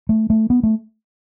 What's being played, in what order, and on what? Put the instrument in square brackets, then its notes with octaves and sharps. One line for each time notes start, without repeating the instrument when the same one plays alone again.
[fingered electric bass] A3
A3
B3
A3